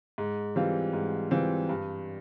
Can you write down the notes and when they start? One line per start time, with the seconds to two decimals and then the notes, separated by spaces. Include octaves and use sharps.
0.18 G#2
0.56 E3 G3 C4 F4
0.93 G#2
1.31 E3 G3 C4 F4
1.69 G2